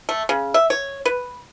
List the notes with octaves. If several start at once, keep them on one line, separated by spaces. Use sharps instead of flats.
A3
C#3
E5
C#5
B4